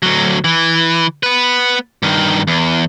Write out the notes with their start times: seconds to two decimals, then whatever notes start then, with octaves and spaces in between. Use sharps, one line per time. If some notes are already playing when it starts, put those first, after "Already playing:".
0.03 D2 F#3
0.44 E3
1.23 B3 B4
2.03 G2 D#3
2.48 E2